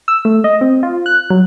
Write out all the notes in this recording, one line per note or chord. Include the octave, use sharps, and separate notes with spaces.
E6
A3
D#5
C4
F4
F#6
F#3